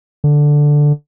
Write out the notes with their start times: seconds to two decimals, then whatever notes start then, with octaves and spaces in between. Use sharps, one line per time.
0.24 D3